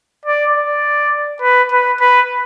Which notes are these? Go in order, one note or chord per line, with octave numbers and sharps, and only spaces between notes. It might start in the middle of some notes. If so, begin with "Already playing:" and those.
D5
D5
B4
B4
B4